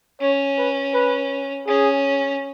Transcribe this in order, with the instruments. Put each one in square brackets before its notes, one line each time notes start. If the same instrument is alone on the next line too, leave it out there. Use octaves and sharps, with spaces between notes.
[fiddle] C#4 [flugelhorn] C#5
[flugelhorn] B4
B4
[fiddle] C#4 [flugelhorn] G#4